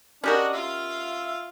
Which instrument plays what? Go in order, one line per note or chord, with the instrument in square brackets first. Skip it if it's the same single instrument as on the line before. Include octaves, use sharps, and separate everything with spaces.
[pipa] C#4 G4 A#4 [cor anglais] D4 [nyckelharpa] F#4 D#5
[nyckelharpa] F4 F5 [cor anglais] E5